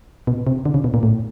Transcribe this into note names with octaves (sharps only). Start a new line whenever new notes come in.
B2
C3
D3
C#3
B2
A#2
A2